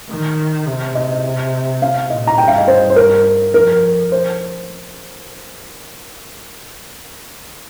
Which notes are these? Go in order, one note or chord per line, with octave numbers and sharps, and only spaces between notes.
D#3
C3
C3 D#5
F5
A#2 D#5
A#5
G2 G5
F5
D#5
C5
C5
A#4
F2 A#4
C5